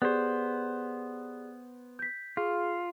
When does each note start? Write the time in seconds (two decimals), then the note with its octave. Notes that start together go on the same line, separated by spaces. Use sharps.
0.02 B3 G4 G#4 C5 D5
1.99 G6 B6
2.37 F4 G#4